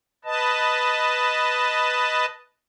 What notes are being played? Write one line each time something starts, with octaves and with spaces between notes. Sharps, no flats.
B4 D#5 A5